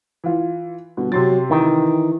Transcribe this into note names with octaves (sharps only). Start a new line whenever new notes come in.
E3 F4
G1 B2
C3 F#3 C6 A6
D#3 E3